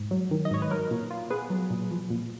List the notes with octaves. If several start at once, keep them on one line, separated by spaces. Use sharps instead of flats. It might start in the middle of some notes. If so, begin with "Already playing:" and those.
Already playing: G#2
F#3
D#3
D#5
G#2 C#5
B4
F#3 A#4
A#2
F4
B3 G#4 B4
F#3
A#2
F3
A#2